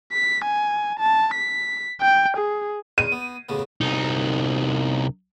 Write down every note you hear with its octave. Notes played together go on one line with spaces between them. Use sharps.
B6
G#5
A5
B6
G5
G#4
E2 D#7
B3
A1 C#3 B3
C2 D#4